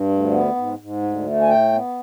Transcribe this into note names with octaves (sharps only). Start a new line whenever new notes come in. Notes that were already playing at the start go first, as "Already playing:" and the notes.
Already playing: G2
D2
B3
G#2
G#2
D2
A3
G#5
A2 G5
B3